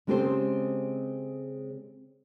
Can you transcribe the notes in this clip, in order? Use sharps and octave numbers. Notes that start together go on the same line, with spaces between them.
C#3 G#3 C4 G4 A4 C5